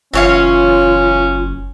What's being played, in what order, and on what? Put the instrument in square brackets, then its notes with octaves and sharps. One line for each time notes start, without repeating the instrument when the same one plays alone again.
[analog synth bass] F#1 [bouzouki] E3 C#5 F5 [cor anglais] C#4 [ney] F4